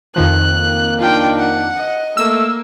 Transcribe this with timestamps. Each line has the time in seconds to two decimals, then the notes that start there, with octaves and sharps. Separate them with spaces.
0.16 F2 D#3 F3 F#6
0.52 A#3
0.99 D4 D#4 F4 G5
1.39 F#5
1.77 D#5
2.17 A3 A#3 E6